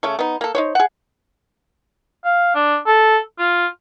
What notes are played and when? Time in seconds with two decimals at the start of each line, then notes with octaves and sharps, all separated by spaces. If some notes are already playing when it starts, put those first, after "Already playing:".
0.03 C#3 A3 C#5
0.19 B3 D#4
0.41 A#3 A4
0.55 D#4 C5 C#5
0.75 G#4 F#5
2.25 F5
2.55 D4
2.86 A4
3.39 F4